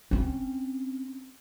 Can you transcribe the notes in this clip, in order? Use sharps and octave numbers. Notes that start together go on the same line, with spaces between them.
C4 C#4